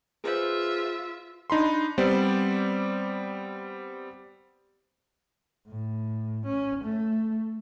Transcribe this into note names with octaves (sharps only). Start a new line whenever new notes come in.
F4 G#4 B4 C5 E5
D4 D#4 B5 C6
G3 B3 C4 C5 D5
A2
C#4
A3